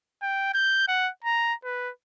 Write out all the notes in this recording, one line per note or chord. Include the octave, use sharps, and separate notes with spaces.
G5
G6
F#5
A#5
B4